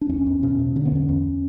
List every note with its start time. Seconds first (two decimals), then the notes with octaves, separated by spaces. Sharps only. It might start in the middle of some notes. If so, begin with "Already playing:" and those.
0.01 D4
0.09 E2 C#4
0.26 E2
0.43 B2 C#4
0.59 B2
0.76 D3 C#4
0.85 B3
0.92 E2 C#4
1.09 E2